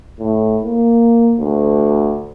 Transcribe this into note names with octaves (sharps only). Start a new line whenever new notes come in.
A2
A#3
D2